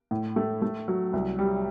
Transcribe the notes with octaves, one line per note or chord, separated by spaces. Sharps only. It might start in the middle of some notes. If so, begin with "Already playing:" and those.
A2
A3
A3
F#3
C2
G3